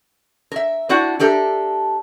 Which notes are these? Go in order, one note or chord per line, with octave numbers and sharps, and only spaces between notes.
A#4 E5
C4 D4 E4 F#4 D5 F#5
D4 G4 A4 A#4 E5